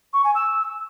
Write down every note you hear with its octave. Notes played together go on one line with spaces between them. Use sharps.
C#6
G#5
E6